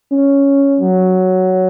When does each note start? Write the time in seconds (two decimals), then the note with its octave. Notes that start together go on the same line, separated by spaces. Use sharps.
0.12 C#4
0.80 F#3